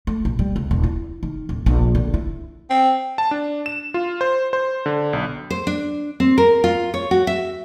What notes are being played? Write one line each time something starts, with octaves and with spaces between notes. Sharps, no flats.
A3
A#1
G3
C#2
D#1
E4
D#3
D1
A#1
D3
E4
C4
A5
D4
E7
F4
C5
C5
D3
B1
C5
D4
C4
A#4
F4
C#5
F#4
E5